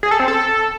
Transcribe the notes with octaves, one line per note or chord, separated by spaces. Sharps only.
G#4
A4
C4
A4